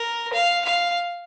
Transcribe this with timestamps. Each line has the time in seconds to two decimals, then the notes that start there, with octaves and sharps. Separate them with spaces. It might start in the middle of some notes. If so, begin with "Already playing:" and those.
Already playing: A#4
0.33 F5
0.65 F5